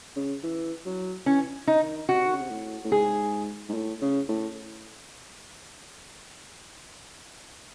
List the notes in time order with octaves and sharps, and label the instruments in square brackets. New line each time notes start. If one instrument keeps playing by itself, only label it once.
[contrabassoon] C#3
E3
F#3
[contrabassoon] E3 [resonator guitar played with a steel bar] C#4
[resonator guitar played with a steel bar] D#4
[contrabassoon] D#3
[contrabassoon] C3 [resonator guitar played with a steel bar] F#4
[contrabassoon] D#3
C#3
C3
A2
A2
[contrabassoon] G#2 [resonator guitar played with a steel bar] G#4
[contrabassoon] G#2
A2
C#3
A2